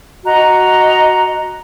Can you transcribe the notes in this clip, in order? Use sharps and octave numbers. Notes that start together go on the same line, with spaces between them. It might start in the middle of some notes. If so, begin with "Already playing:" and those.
F#4 D#5 A#5